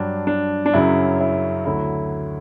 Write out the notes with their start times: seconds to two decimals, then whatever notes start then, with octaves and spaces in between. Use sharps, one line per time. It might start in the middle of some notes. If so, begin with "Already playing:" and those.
Already playing: G2 F#3 D4
0.27 D4
0.66 D4
0.73 F#2 C#3 F#3 E4
1.20 E4
1.66 D2 D3 F#3 E4